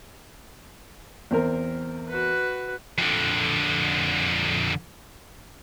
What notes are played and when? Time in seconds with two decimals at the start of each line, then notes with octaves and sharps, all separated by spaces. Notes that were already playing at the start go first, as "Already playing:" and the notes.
1.31 E2 C4 A#4
2.09 F#4 B4
2.98 F2 D3